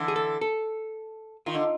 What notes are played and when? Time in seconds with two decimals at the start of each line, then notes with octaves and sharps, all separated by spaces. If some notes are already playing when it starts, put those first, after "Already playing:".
Already playing: D3 E3
0.08 G#4
0.16 A4
0.41 A4
1.46 D#3 F4
1.55 D3